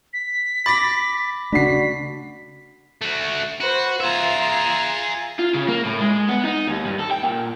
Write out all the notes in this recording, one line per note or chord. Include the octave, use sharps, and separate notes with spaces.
B6
B5 D6 A6 A#6
C#3 A3 D4 F#4 B6 C7
A3 F#4
F#4 B4 C5
F4 G#4 E5 A#5
F4
C#3
A#3
A2
G#3
B3
D#4
D#2
G2
A4
G5
A#2